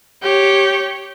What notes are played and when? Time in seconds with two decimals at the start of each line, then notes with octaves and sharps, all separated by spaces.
0.22 G4 C#5